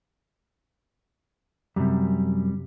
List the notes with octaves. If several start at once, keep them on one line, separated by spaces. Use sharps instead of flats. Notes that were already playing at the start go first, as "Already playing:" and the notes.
F#2 C3 G3